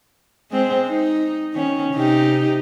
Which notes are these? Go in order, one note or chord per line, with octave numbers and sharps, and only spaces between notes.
G#3 C4
D#4
D#3 C#4
C3 D#4 G4